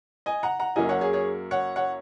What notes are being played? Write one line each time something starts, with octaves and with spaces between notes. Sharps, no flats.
D#5 G#5
F#5 A#5
F#5 A#5
F#2 F#3 A#3 D#5 G#5
C#5 F#5
G#4 C#5
G#4 C#5
C#5 F#5
C#5 F#5